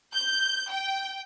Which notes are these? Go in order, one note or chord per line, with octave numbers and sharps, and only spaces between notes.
G6
G5